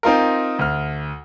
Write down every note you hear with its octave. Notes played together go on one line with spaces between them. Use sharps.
C4 D#4 F4 A#4
D2 F6